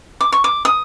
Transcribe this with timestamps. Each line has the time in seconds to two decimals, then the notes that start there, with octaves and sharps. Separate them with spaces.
0.21 D6
0.32 C#6
0.44 D6
0.65 D#6